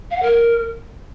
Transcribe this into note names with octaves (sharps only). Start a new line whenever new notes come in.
F5
F#5
A#4